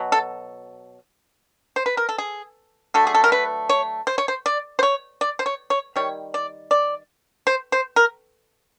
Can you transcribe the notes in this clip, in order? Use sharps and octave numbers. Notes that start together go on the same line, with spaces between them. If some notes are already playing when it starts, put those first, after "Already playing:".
Already playing: B2 F#3
A4
C5
B4
A#4
A4
G#4
D3 F#3 A3 A4
G#4
A4
A#4
B4
C#5
C5
C#5
C5
D5
C5
C#5
D5
C5
C#5
C#5
D#3 G3 C#5
D5
D5
C5
C5
A#4